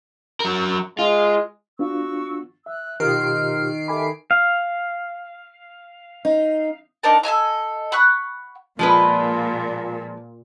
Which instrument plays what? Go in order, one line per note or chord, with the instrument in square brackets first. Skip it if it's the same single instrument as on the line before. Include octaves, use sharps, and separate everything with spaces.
[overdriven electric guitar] F#3 A#4
[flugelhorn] G#3 [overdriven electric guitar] F4
[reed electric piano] B3 D4 F4 [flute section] F#4 C#6 E6
[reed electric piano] E5 [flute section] E6 F#6
[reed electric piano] B2 F4 G4 [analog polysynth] D#3 C7 D7 [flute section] C5 F6
[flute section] G4 E5 D6 [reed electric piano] A4 G#5 B5
[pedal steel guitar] F5
[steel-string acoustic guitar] D#4
[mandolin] D4 D#4 A#4 A5
A4 D#5 G#5 A#5
F#5 B5 C#6 F#6
[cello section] A#2 [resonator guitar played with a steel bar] F3 G#3 B4